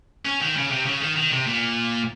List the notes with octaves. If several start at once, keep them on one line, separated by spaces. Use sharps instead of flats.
C#4
D#3
C#3
C3
C#3
D#3
D#3
C3
A#2